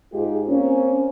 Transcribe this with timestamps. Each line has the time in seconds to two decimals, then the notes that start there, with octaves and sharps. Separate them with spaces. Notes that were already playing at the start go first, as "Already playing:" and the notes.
0.12 G#2 G#3 F4 G4 G#4
0.47 A#3 C4 C#4